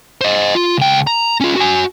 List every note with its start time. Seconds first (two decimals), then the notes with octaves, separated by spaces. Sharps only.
0.21 C5 D#5
0.55 F4
0.78 C#2 G5
1.07 A#5
1.40 C#4 F4
1.56 F#4 G#5